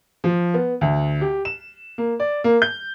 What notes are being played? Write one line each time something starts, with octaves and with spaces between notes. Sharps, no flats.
F3
B3
D2
G4
E7
A#3
D5
A#3
G6